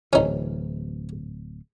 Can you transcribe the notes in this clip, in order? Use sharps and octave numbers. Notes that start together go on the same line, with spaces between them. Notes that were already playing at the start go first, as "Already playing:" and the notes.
D1 E3 C#4 D#4